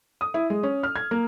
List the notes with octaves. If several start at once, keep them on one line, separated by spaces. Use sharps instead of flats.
D#6
E4
G#3
C#4
F6
G#6
A#3